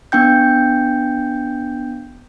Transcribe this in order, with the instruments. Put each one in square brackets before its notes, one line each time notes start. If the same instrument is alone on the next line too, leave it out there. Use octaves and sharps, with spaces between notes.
[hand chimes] B3 D4 G5 G6